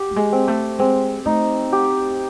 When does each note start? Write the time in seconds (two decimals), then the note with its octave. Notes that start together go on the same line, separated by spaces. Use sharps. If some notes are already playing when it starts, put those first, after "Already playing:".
Already playing: G4
0.11 G3
0.16 G#3
0.32 C4
0.48 A3
0.79 G#3 C4
1.25 A3 D#4
1.72 G4